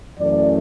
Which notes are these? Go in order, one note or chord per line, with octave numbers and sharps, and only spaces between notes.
F#2 E3 A3 C#4 D5